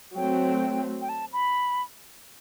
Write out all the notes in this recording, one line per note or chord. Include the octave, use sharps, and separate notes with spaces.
F#3 A3 C4 G5
G5
A5
B5